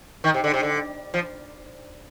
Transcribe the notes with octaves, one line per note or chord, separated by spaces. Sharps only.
D#3
C3
D3
C3
D3
F3